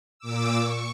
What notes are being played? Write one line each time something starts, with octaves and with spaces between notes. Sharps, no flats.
A#2 D6 E6
C#6